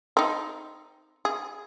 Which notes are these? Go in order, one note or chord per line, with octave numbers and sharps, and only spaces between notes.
C4 D#4
G#4